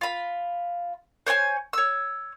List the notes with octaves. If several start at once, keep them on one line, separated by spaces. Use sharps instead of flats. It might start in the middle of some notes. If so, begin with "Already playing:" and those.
F4 B5
C5 C#5 G5 G#5
C#5 E6